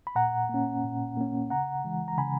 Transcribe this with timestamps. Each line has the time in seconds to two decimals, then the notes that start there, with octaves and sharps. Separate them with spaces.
0.07 B5
0.15 A#2 F#5 A#5
0.49 A#3 C#4
0.84 A#2
1.17 A#3 C#4
1.50 C#3 F#5 A#5
1.85 E3 G#3
2.08 A#5
2.18 C#3 G#5 B5